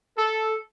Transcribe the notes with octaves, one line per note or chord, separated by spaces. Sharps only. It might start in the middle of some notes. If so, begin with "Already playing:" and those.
A4